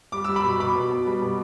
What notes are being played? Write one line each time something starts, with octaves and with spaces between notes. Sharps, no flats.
G3 D6
G3 E6
B5 D6
B2
B2 B5 D6
B2
B2
G3
B2